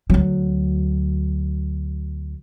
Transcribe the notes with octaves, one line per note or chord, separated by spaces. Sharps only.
D2 F#3